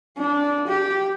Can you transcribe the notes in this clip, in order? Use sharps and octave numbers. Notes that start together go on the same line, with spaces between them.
D4
G4